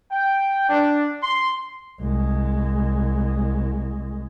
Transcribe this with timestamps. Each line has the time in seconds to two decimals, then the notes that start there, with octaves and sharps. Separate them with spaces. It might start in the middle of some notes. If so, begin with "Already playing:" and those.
0.11 G5
0.68 D4
1.22 C6
2.00 C2 G#3